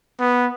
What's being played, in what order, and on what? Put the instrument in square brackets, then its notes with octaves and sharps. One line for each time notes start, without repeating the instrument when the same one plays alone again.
[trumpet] B3